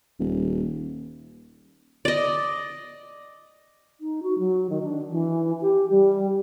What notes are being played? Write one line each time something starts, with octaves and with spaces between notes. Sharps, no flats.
D#1
D5 D#5
D#4
F#4
F#3
D#3
D4
E3
G4
G3